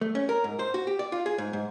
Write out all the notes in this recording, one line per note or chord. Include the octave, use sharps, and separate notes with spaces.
A3
C#4
A#4
G#2
C5
F#4
G4
D5
F4
G#4
G#2
G#2